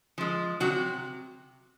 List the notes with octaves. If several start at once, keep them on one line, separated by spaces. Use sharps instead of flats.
F3 G#3
C3 F#3 F#4